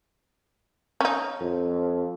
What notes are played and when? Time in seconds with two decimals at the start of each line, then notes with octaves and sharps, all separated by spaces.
1.01 C#4 D#4
1.41 F2